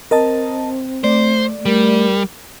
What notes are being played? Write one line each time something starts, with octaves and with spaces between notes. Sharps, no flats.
C4 A#4 D#5 A5
A3 C5 D5
G3 A#4